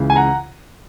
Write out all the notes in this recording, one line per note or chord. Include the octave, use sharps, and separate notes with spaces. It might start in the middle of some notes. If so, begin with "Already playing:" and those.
Already playing: C#2 C#3 E3
G#5
F#5 A#5